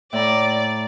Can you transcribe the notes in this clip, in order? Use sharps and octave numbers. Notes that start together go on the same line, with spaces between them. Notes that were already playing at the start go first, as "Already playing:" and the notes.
A2 D5 A#5